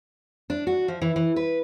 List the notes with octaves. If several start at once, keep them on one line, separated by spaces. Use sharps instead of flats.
D4
F#4
F3
E3
E3
B4